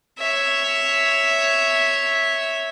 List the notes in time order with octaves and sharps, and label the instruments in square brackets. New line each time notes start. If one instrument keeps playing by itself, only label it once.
[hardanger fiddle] C#5 E5